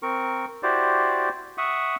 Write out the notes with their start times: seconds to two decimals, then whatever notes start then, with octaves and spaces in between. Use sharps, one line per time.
0.02 C4 A#4 C#6
0.63 E4 F#4 G4 C5 D5
1.58 E5 F#5 C#6 D#6